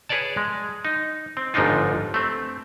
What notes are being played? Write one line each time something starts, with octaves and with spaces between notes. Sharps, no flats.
G#4 B4 C#5 D5 A5
G#3
D#4
C4
G1 G#2 F3 D4 D#4 F4
A3 C4